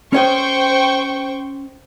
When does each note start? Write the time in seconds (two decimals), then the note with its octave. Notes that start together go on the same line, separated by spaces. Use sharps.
0.13 C#4 C5 C#5 D#5 G5 C#6